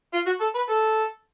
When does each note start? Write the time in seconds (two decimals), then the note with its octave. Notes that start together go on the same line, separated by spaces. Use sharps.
0.13 F4
0.27 F#4
0.41 A4
0.55 B4
0.70 A4